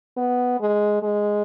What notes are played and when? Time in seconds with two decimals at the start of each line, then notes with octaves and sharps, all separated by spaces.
0.17 B3
0.60 G#3
1.03 G#3